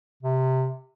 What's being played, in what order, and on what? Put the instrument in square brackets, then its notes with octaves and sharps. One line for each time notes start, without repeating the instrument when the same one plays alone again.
[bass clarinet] C3